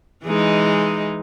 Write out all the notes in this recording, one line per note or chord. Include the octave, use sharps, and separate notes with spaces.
E3 G#3 D#4